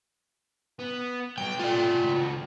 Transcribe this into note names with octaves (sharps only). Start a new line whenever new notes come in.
B3
F#3 B3 G5
A3 F4 G4 D5
C#2 F#4